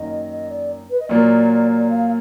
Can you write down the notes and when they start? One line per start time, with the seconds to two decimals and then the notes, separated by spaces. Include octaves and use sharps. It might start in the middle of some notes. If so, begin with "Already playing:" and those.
Already playing: F#2 D#3 A#3 D#4 D#5
0.30 D#5
0.49 D5
0.90 B4
1.00 D#5
1.09 A#2 F#3 A#3 F4 D5
1.90 F5